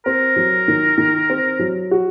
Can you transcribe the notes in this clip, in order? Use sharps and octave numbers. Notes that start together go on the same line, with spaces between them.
C4 A#4
F#3
D#3
D#3
C4
F#3
F#4